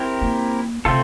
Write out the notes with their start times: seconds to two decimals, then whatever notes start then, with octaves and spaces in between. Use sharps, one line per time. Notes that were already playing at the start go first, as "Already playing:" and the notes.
Already playing: C4 E4 G4 A#4
0.21 A#3
0.85 C3 A3 C4 F4 A4